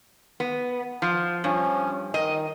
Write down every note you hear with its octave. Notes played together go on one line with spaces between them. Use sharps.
B3
F3
G2 F3 C#4
D#3 D#5